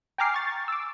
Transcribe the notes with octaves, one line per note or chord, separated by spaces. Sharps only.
G5 G#5 A#5 D6 F6 C7
C#6 A6
D6 E6